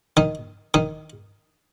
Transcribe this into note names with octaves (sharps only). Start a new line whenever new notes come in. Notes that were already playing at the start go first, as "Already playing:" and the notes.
D#3 D#4
D#3 D#4